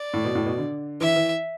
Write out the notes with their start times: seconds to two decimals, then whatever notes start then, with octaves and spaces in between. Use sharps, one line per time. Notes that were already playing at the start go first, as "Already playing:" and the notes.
Already playing: D5
0.14 A2
0.25 B2
0.35 A2
0.46 B2
0.58 D3
1.01 E3 E5
1.16 E3